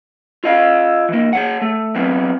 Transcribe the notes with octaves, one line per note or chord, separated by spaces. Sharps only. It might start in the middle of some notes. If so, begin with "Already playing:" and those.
F4 D#5 F5
E3 A#3
G#4 C#5 F#5
A3
F#3 B3 C4